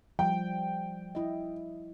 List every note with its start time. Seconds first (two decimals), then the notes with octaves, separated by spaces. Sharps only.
0.19 F3 G3 G5
1.15 E4 D#5